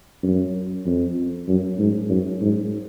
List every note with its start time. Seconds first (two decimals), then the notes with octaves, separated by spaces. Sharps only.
0.23 F#2
0.86 F2
1.48 F#2
1.79 G#2
2.10 F#2
2.41 G#2